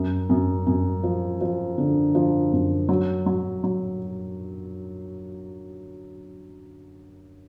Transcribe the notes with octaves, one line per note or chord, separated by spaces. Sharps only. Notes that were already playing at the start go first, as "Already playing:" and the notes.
Already playing: F#2
F#2
F#2
F3
F3
D3
F3
F#2
F#3
F#3
F#3